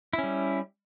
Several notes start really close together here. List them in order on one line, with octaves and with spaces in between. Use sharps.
E4 C#4 G3